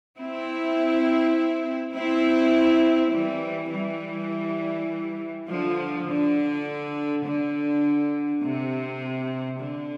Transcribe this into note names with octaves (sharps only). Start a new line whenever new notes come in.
C4 E4
C4 E4
E3 G3
E3 G3
D3 F3
D3
D3
C3
D3